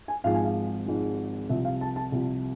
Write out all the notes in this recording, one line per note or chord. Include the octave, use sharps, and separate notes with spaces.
G#5
G#1 G#2 F3 G#3 F5
G#5
F5
G#1 G#2 F3 G#3
C2 C3 F3 E5
F5
A5
A5
C2 C3 F3